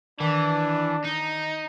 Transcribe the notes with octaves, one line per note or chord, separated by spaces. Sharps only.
D#3 E3 D4
D#4